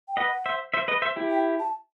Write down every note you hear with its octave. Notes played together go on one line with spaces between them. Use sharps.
G5
B4 D#5 F#5
C5 E5
C5 E5
B4 D#5
C5 E5
E4 G4
G5
A5